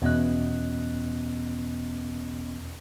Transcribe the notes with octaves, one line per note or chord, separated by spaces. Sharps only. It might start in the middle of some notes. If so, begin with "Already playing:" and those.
E2 B2 B3 C#4 D#5 F#6